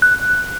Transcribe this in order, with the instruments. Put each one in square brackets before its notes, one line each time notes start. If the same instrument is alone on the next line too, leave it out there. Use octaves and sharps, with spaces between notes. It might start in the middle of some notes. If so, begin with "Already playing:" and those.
[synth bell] F#6